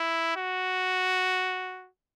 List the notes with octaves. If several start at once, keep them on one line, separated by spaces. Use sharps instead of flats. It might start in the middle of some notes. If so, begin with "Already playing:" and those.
Already playing: E4
F#4